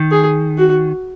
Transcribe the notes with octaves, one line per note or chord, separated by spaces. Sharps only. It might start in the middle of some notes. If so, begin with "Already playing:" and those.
Already playing: D#3
G#4
F#4